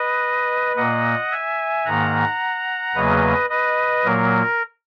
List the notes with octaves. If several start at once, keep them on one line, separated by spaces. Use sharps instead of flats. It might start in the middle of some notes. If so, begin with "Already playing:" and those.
Already playing: B4 D#5
A#2 A#3 D#5 F#5
E5 G#5
G#2 D#3 A#3 F#5 A#5
E2 C#3 F#3 A#3 B4 D#5
B4 D#5
A#2 F#3 A#3 A#4